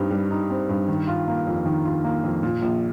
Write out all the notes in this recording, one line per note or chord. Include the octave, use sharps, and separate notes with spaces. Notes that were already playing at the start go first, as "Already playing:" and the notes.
Already playing: G2 G3 C4 D#4
G3
D#4
C4
G2
D#3
F4
A#3
F2
D#3
F4
A#3
F2
A#2
A#1